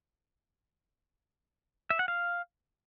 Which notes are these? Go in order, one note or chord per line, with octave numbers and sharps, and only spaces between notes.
E5
F#5
F5